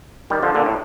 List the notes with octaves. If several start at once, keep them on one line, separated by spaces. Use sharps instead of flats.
D#3 G3
D3 F3
A#2 D3
A2